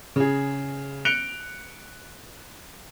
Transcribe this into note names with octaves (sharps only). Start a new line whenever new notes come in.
C#3 G#4
F#6 C#7 D7 F7 G7